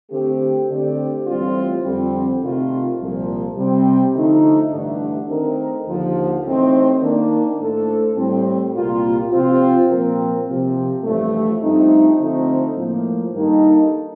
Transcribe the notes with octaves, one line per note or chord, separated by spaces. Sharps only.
D3 A3 C4 G4
D3 A3 C4 G4 D5
A1 A2 G3 C4 F4
F2 D3 G3 C4
C3 D#3 A3 C4 F4
C2 A#2 F3
C3 G3 C4
D3 F3 A3 D#4
A1 G2 D3 A3 D4
D#3 A3 C4 D#4 A#4
D#2 D3 F3
A1 A2 A3 C4 D#4
D#3 A#3 D4
A2 A3 D4 A4 C5
A2 G3 C4
C2 A#2 G3 A#3 F4
C3 F3 C4 F4
A#2 F3 C4 F4 A#4
C3 F3 C4
A1 G2 F3 A3
G2 F3 A3 C4 D#4
D3 F3 A3 C4 D#4
A2 F3 A#3
G2 D#3 A#3 D#4 A4